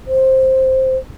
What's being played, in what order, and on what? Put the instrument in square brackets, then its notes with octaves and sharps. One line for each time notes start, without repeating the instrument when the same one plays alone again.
[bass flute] C5